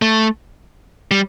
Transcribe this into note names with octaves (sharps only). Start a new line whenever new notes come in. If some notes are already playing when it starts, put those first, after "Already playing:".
A3
G3